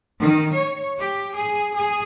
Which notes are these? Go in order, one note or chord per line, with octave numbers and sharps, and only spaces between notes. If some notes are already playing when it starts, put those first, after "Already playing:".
D#3
C#5
G4
G#4
G#4